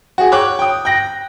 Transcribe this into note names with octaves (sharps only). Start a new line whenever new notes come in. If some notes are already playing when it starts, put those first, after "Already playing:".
F#4 G#4
C#5 G5 D6 F#6
G5 D#6
G5 F#6 A#6